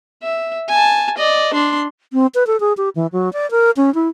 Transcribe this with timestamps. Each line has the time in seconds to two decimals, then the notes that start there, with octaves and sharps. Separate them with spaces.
0.23 E5
0.69 G#5 A5
1.17 D5 D#5
1.53 D4 C6
2.13 C4
2.35 B4
2.47 A4
2.60 G#4
2.77 G4
2.96 E3
3.13 F#3
3.33 D5
3.51 A#4
3.77 C#4
3.95 E4